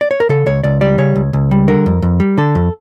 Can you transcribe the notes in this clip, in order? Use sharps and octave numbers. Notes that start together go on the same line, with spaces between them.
D5
C#5
A#4
C#3 A4
C#2 C#5
C#2 D5
G3 D5
C#3 C#5
C#2
C#2
G3
D3 A#4
F2
F2
G3
D3 A4
F2